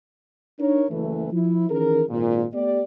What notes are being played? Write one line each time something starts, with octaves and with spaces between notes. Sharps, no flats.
D4 D#4 A#4 C#5
F#1 E3 A3
F3 E4
D#3 E3 C#4 G#4 A#4
G#1 A#2
A3 B3 G4 D5